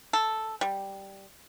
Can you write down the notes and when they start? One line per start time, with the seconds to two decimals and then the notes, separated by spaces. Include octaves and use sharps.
0.13 A4
0.61 G3